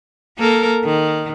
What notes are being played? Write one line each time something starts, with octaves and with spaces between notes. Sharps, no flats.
A#3 A4 A#4
D#3